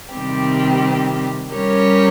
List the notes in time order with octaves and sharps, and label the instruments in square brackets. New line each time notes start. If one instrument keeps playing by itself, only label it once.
[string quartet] C3 D#3 G3 C4 G4
G3 C#4 G4 A#4 C#5